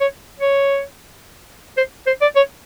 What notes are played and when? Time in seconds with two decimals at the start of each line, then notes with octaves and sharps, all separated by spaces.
0.01 C#5
0.40 C#5
1.77 C5
2.07 C5
2.21 D5
2.36 C#5